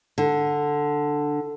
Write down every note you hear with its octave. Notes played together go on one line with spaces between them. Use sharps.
D3